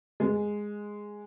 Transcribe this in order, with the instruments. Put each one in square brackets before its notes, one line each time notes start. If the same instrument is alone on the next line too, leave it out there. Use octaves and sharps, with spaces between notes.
[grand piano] G#3